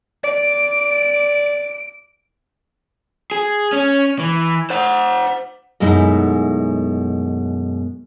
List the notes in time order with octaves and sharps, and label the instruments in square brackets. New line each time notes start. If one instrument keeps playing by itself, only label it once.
[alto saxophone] D5 [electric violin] D7
[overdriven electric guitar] G#4
C#4
E3
C5 F#5
[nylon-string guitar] F#2 B2 G#3 A3 D#4 E4